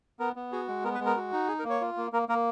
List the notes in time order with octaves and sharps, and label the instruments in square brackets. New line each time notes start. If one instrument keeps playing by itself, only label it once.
[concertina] B3 A#4
B3
F#4 G#4
G#3
B3 A#4
B4
G#3
A#4
F#4
D#4
G#4
A#4
A#3
C#5
F4
A#3
A#3 A#4
A#3 A#4